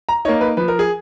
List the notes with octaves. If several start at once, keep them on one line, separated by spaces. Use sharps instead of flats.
A#5
A#3 D#4 C#5
B4
F3 B4
A#4
G#4